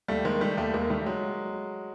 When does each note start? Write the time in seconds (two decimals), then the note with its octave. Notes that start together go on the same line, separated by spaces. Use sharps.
0.08 D#2 G3 A3
0.25 D#3 G#3 A#3
0.41 D#3 G3 A3
0.57 D#2 G3 A3
0.74 D#2 G#3 A#3
0.90 D#3 G3 A3
1.01 A3
1.06 F#3 G#3